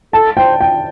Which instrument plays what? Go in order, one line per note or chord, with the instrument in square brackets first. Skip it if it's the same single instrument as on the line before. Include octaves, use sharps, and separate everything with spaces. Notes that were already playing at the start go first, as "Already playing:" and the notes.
[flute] A4 [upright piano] A5
[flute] C5 [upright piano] G5
[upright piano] G5